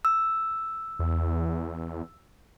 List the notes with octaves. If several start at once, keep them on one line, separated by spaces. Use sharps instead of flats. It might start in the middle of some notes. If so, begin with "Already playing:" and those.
E6
E2